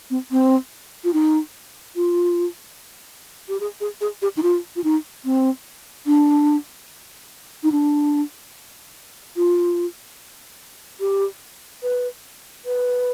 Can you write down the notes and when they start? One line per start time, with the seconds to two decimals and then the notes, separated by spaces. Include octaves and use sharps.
0.10 C4
0.31 C4
1.04 F4
1.13 D#4
1.96 F4
3.49 G4
3.60 G#4
3.81 G#4
4.01 G#4
4.22 G4
4.37 D#4
4.43 F4
4.76 F4
4.84 D#4
5.25 C4
6.07 D4
7.63 D#4
7.72 D4
9.36 F4
11.00 G4
11.83 B4
12.66 B4